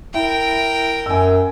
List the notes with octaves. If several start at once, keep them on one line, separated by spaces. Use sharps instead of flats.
E4 A#4 G5
F#2 G#5 E6